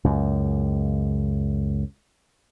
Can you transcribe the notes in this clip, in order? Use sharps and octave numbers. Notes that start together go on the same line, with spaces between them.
C#2 F#2